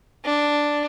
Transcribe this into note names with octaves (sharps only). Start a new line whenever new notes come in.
D4